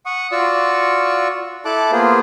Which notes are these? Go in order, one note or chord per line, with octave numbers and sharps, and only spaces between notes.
F#5 C#6 D#6
F4 F#4 D5 C#6 E6
E4 A4 A5 D6 F#6
A#3 B3 F4 G#4 C5